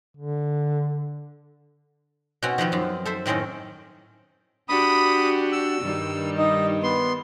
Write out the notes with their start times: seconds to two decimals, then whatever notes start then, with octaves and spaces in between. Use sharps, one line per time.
0.17 D3
2.42 B2 C4 C#4 F#4
2.58 D#3 F3 B3 C4
2.72 F#2 F4
3.05 A4 C5 E5
3.26 A2 D#3 C4 C#4 D#4
4.69 D4 F#4 G4 B5 D#6
5.53 E6
5.82 G2 D#3 G3
6.38 D#4
6.83 B3 C6